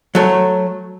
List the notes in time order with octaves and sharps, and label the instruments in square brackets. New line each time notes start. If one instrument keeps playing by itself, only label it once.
[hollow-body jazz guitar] F#3 A3 C#5